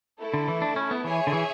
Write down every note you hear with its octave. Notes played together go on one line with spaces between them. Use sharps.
A3 E4 A4
D3
E3
D4
C#4
B3
E3 G#4 C#5 E5 G#5
D3
E3